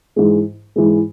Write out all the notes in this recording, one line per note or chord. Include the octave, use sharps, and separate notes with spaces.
G#2 E3 G#3
G#2 E3 G#3